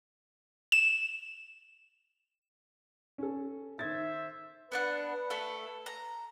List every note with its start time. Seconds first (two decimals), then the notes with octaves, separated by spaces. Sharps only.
0.72 E7
3.18 C#4 A4
3.79 D#3 C5 E5 G#6 A6
4.72 B3 D4 B4 F#5
5.30 A3 E4 A4
5.86 A#5